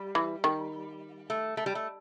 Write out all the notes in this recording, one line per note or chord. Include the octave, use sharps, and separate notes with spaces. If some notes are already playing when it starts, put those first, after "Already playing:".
Already playing: G3
E3
D#3
A3
A3
G3
A3